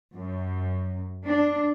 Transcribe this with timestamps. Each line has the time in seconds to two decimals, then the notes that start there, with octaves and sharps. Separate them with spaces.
0.13 F#2
1.23 D4